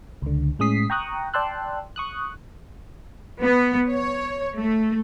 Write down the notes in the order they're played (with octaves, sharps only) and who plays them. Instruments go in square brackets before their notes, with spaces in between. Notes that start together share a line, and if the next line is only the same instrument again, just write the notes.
[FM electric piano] C#2 D3
A2 G#3 C#4 D#6 B6 C7
G5 A#5 C#6 D#6 F#6
D5 G5 A5 C6 E6 F#6
C#6 D#6 F#6
[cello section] B3
C#5
A3